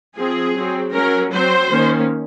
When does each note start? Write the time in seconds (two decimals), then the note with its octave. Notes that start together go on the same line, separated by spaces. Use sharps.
0.16 F3 C4 G#4
0.55 F#3 C4
0.93 F#3 C#4 A#4
1.32 F#3 C4 C5
1.70 D#3 A#3 C#4